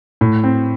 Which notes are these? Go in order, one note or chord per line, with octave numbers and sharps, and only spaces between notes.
A2
C4